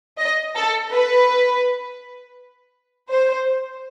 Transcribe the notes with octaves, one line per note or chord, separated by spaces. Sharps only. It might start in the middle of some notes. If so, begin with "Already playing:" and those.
D#5
A4
B4
C5